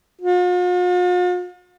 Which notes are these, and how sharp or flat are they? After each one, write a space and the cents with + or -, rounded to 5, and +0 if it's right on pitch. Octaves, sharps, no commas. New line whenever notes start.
F4 +45